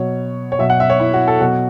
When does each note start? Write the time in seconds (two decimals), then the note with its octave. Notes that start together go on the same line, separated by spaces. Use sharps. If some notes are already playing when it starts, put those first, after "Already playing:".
Already playing: B2 F#3 C#5
0.52 C#5
0.59 B2 F#3 E5
0.70 F#5
0.80 E5
0.90 C#5
1.00 E4
1.14 F#4
1.27 A4
1.40 B2 F#3 F#4